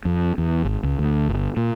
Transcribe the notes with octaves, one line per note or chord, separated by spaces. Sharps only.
F2
E2
G#1
C#2
D2
G1
A#2